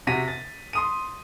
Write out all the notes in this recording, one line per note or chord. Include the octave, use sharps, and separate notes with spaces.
C3 F#4 A#6 B6 D#7
A6
C6 D#6 D#7